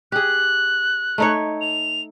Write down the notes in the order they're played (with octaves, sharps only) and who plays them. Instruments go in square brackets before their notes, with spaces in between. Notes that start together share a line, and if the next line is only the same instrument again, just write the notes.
[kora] G4 G#4 [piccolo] F#6
[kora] A3 D#4 C#5
[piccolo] F7